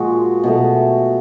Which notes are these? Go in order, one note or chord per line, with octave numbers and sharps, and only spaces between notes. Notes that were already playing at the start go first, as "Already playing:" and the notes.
Already playing: A#2 F3 G#3 F#4 G#4
B2 F#3 A3